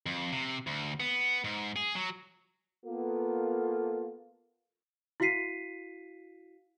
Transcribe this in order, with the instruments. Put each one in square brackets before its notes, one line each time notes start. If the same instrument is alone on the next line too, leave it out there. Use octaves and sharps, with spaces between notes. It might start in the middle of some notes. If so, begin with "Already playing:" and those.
[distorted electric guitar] F2
C3
D2
B3
G#2
G#4
F#3
[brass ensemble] A#3 B3 F4 A4
[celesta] E4 F#4 F5 B6 C7 D#7